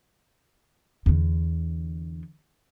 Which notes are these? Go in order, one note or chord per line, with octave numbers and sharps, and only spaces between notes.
E2 D3